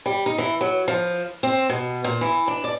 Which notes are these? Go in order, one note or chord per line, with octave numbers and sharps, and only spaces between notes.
G3
D#4
E3
F#3
F3
C4
B2
A#2
E3
D4
D5